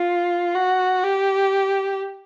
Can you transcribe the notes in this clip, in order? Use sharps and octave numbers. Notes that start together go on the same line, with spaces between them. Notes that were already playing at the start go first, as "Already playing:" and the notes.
Already playing: F4
F#4
G4